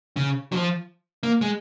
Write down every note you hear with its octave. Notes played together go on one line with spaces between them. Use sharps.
C#3
F#3
F3
A#3
G#3